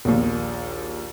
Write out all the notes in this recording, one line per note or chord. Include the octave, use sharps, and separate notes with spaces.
A#1 D#2